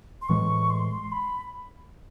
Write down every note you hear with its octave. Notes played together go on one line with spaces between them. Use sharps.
C6
A2 E3 G#3 C#6
C6
B5